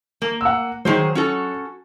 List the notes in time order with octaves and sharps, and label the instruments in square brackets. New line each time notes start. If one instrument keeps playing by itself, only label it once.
[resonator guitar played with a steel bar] A#3
[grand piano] F#5 E6
[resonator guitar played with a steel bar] D#3 G#4 C5 [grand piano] F#3
[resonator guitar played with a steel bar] C#4 F#4 A4